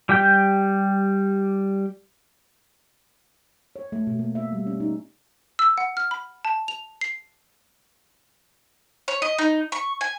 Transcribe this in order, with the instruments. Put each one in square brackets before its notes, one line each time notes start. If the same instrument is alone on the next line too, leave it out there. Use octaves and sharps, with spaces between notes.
[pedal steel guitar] G3 G4 G5 G6
[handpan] C#5
A3
B2
A#3
E5
G3
C#4
D#4
[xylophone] E6
F#5
F6
B5
A5
F7
C7
[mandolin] C#5
D#5
D#4
C#6
G#5